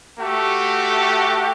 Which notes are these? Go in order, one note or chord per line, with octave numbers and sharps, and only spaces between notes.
A3 F#4 G4